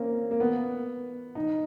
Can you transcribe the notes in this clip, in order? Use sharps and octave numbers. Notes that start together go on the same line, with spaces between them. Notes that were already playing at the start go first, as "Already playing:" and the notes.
Already playing: A#3 C4 C#4
A#3
B3
D#4